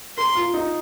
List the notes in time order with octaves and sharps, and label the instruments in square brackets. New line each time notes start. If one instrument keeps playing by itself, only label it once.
[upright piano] A#4 [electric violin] C6
[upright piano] F4
D#4